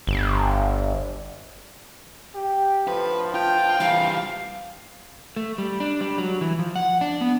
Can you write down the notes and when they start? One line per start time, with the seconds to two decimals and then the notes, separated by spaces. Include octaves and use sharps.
0.07 G1
2.35 G4
2.88 A2 D3 F3 B4
3.34 F4 G5
3.80 E3 G3 F5
5.36 A3
5.58 G3
5.80 D4
6.01 G3
6.18 F#3
6.41 E3
6.59 F3
6.76 F#5
7.01 D4
7.21 B3